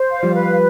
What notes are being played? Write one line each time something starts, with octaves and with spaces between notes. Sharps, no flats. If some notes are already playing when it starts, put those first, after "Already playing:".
Already playing: C5
F5
F3 G3
B4